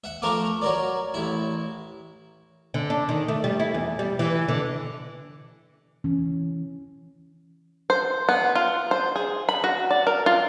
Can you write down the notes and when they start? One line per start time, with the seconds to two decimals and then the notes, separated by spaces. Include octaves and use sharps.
0.04 E5 F#5
0.22 F3 A3 A#4 E5 F5 D6
0.62 F#3 A#4 D5
1.14 A1 E4
2.74 D3
2.90 D4
3.09 D#3
3.28 A3
3.44 G3
3.60 E4
3.74 E2
3.99 G3
4.19 E3
4.48 D3
6.04 E3 C#4
7.90 C5
8.29 B3
8.55 F4
8.91 C5
9.16 G#4
9.49 B5
9.64 F#4
9.91 D5
10.07 A#4
10.26 F4